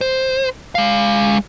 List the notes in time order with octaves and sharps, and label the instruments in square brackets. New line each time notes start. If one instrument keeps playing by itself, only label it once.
[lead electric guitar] C5
G#3 F5